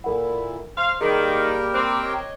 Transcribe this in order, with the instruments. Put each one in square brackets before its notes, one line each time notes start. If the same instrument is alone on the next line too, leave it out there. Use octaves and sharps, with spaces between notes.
[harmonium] A#2 E4 [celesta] A4 A#4 F#5
[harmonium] C5 [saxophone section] F5 [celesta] C6
[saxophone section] D#3 [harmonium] G3 A#3 [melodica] G4 A#4 G5 [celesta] G#4
[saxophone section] C4 [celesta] D6 F#6
[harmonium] C#5 D#5